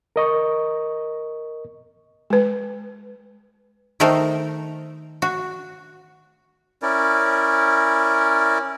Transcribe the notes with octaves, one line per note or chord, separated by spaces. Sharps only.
A#4 D#5 C#6
G#3 B4
D#3 A3 D#4 A4 A#4 C5
F#4
C#4 E4 A#4 D5